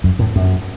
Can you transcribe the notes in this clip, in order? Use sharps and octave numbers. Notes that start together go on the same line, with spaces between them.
F#2
A2
F#2